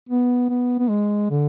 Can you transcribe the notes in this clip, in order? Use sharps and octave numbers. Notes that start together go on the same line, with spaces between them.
B3
B3
B3
G#3
D3